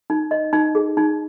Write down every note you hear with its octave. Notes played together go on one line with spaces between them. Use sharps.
D#4
D#5
D#4
G#4
D#4